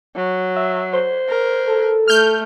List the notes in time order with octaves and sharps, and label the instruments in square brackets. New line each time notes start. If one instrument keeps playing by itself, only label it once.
[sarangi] F#3
[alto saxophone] E5
C5
[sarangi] A#4
[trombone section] A4
[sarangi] A3 [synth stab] F6 G6